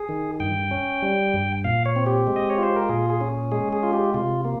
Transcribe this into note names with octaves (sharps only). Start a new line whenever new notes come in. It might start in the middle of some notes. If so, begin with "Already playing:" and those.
Already playing: G#4
D#3
G2 G5
C#4
G3
G2
A#2 F5
C#5
C4
G4
G#3
D#5
C#5
F4 C5
A#4
A#2 G#4
G#4
C#4
G#3 G#4
G#4
F4
G4
C3 F4
A#3